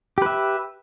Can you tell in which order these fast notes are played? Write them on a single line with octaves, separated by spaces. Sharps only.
G4 B4 E5